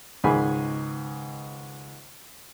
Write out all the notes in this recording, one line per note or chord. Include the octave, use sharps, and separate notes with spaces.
C#2 G#2 D#3 G#4 G#5 B5